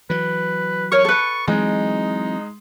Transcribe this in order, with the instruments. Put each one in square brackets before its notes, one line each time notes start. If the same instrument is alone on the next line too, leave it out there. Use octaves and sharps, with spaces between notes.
[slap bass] E3 F#3 [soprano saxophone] B4
[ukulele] A#4 C#5 [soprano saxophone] C#6
[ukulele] A4 B4
[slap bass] E3 F#3 C4 [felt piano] G#3 [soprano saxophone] D#4